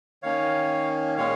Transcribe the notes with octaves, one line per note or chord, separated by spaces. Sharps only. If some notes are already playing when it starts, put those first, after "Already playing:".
D#3 A#3 C#4 C#5 F5
A#2 G#3 C#4 C#5 F5